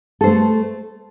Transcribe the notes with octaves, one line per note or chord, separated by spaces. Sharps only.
A3 A4 C5